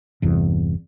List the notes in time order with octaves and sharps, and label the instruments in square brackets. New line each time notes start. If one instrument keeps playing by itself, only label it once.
[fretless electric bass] G1 E2 C3